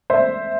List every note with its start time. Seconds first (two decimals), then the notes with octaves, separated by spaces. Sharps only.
0.10 C5 E5